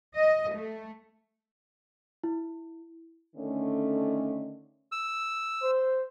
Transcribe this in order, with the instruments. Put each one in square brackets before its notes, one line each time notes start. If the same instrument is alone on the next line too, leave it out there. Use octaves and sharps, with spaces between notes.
[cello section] D#5
A3
[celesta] E4
[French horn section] D3 D#3 A3 C#4
[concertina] E6
[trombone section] C5